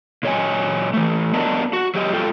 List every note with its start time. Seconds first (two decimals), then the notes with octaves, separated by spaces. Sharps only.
0.23 A#2 F#3 C#5 D#5 G5 G#5
0.93 E3 A3
1.33 F#3 B3 D4 A#4 D#5 A5
1.73 F#4
1.95 F#3 G4 D#5
2.13 G#2 F4 A4 G5